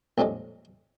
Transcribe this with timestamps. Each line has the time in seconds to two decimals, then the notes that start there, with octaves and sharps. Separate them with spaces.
0.18 A#1 F2 A2 G3 G#3